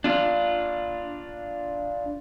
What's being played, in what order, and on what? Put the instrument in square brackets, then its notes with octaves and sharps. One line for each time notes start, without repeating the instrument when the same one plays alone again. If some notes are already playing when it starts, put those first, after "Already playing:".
[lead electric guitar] D4 F4